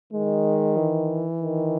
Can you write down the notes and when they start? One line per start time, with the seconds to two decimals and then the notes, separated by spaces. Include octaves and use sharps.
0.13 D#3 G#3
0.77 E3
1.41 D#3